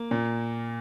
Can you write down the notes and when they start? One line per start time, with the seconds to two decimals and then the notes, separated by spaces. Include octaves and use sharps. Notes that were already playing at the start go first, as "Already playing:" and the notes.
Already playing: A#3
0.11 A#2